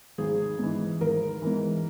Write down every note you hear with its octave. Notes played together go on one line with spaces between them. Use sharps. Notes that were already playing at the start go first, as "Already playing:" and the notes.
G#1 G#4
G#2 E3
G#1 A#4
G#2 E3